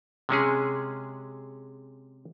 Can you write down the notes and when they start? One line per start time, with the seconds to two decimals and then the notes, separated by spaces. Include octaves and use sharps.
0.29 C3 G#3 C#4 G#4